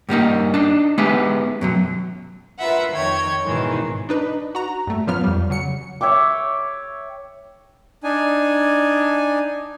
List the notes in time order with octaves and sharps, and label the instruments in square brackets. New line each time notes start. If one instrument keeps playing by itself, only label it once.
[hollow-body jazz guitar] G2 G3 A#3 D#4
D4 D#4
G#3 B3 D#4 G4 B4 E5
F#2 B2 F#3
[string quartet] F4 A#4 B4 E5 F#5
F2 D#3 C#5 G5 G#6
G#2 B2 D#3 E3 G#3
[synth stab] D4 D#4 B4
F#4 A#5
G2 A3
F#2 A#2 F3 F#3 B3 F6
F2 G3
C#3 F#3 C#7
[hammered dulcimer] C#5 E5 G5 D6
[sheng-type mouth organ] D4 D#4 G#5